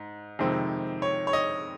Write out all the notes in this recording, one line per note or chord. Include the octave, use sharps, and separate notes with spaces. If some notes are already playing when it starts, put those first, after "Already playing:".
Already playing: G#2
F2 C3 D#3 G#3 C4
C#5
C#5
D#5